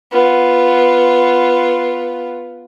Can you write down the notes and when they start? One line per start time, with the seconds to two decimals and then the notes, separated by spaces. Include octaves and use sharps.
0.11 B3 F4